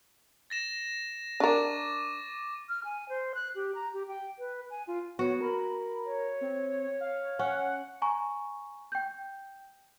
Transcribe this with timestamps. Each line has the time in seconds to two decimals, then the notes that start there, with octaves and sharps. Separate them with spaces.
0.50 A6 A#6 E7
1.40 D4 A#4 C#6 D6 A6
2.69 F6
2.84 G#5
3.09 C5
3.35 F#6
3.56 G4
3.75 A#5
3.94 G4
4.08 G5
4.39 B4
4.70 G#5
4.87 F4
5.19 B3 F#4 C#5
5.41 A#4 B5
6.05 C#5
6.41 C4
7.00 F5
7.39 C#4 F#5
8.02 G#5 A#5 C#6
8.92 G5 G6